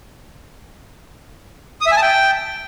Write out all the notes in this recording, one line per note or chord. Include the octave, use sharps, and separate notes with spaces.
D#6
E5
G#5
A5
G5